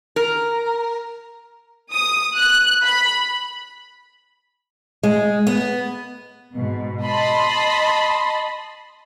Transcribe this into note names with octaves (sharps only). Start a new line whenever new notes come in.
A#4
D#6
F#6
B5
G#3
B3
G#2 B2
D#5 A5 B5 C6